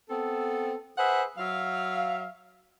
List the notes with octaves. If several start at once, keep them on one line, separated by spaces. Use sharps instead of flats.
B3 C4 A4
G#4 B4 C5 E5 F#5
F#3 E5 F5